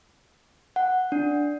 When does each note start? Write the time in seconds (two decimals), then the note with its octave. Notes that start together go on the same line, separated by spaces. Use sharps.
0.76 F#5
1.12 D4